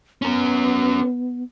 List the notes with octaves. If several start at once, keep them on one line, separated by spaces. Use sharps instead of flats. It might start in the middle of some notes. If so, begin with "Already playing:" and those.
B3 C#4 A#4